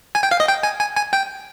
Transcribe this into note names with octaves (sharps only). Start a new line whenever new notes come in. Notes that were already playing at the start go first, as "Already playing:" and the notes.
G#5
G5
F5
D#5
G5
G#5
G#5
G#5
G5